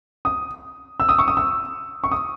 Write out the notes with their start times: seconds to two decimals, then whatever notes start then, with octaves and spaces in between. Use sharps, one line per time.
0.25 D#6
1.00 E6
1.09 D#6
1.19 C#6
1.28 D#6
1.37 E6
2.04 C#6
2.11 D#6